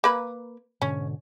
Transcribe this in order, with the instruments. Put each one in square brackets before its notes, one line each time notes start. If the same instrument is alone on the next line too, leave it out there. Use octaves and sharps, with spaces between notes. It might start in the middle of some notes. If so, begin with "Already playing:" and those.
[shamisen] A#3 B4
[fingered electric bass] G#2 B2 D3 [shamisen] C#4